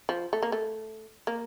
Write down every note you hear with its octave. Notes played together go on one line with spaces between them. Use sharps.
F3
A3
A#3
A3
A#3